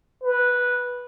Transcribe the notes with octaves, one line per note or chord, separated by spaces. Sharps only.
B4